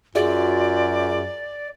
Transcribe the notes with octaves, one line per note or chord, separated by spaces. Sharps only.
F#2 F4 F#4 G#4 D5 E5